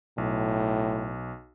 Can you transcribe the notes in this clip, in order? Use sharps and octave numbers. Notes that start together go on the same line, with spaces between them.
B1 A2